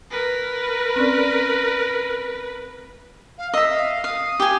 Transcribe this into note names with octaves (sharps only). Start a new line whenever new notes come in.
A#4 B4
C4 C#4 D5
F5
D#5 E5 E6
F5
F5 D#6
G4 G#5